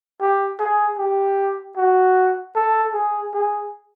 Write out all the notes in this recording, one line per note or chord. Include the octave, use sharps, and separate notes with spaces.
G4
G#4
G4
F#4
A4
G#4
G#4